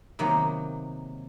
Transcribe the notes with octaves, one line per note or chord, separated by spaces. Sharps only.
C3 D#3 F#3 A#3 B3